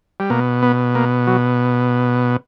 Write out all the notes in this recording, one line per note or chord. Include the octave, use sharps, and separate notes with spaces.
G3
B2 A#3
B3
A#3
F#3